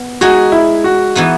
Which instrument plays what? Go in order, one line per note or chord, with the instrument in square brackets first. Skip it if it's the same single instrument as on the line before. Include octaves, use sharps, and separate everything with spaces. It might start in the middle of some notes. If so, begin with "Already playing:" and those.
Already playing: [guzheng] B3
[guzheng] G#3 D#4 G#4 [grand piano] F#4
[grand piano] E4
F#4
[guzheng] E3 B3 D#4 F#4